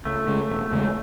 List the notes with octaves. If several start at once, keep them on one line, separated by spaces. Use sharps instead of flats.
C#2 A3
C#3 G#3 C#4
E1
E2 C#3 G#3